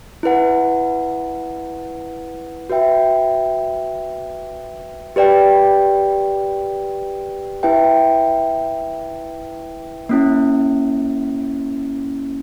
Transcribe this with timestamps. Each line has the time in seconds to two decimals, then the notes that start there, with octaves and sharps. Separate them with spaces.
0.23 E4 B4 F#5
2.70 F#4 B4 E5 G5
5.16 G4 B4 D5 G5
7.63 E4 B4 E5 G5
10.09 A#3 C#4 E4